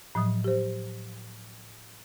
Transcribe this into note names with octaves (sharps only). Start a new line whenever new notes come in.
A2 F3 F#3 D#6
G4 C5